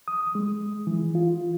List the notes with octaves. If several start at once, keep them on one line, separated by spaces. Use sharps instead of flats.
D#6
G#3
E3
F4